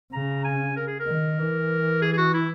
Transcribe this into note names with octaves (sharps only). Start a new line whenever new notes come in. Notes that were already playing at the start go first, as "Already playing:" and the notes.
C#3 A#5
G#5
A#4
G#4
A#4
D#3
E3
G#4
G#4
F#4
E4